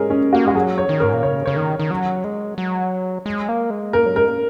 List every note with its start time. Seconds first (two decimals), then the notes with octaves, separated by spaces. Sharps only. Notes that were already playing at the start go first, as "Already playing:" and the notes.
Already playing: G#3 G#4 A#4 C#5
0.10 C#4
0.33 A#3 F#4
0.45 G#3 F#4
0.55 F#3 G#4
0.78 C#5
0.89 D#3
1.00 A#4
1.03 G#2
1.13 A#2
1.23 C#3 C#5
1.46 C#3 C#5
1.56 D#3
1.79 D#3
1.91 F#3
2.24 G#3
2.58 F#3
3.26 G#3
3.49 A#3
3.70 G#3
3.93 A#3 A#4
4.06 F#3
4.16 G#3 A#4
4.27 A#3